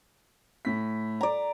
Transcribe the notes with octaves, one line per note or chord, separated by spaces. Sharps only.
A2 B6
D5 A#5